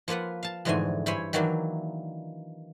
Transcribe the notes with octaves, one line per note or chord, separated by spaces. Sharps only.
F3 A#3 F4 B4 F#5
F5 A5
F2 G#2 D3 E3 A3 G#5
G2 E4 C5 C#5 G#5 B5
D#3 E3 F#3 A#3 D4 E4